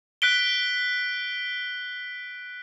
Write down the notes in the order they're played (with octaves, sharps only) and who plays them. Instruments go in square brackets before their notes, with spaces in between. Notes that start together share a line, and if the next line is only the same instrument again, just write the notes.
[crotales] F#6 B6 D7 G7